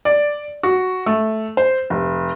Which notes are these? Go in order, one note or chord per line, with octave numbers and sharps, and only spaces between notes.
D5
F#4
A3
C5
F1